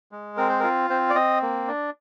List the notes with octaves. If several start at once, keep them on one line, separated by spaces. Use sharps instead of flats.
G#3
C4 A#4
C5
A#4
F4
C4 C5
D5
C4 D#5
A#3
D4